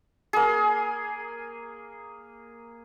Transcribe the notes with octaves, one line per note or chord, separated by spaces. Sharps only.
A#3 G#4